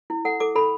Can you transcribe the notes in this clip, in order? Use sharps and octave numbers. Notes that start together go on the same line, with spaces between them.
E4
A4 F#5
A4 D6
A4 B5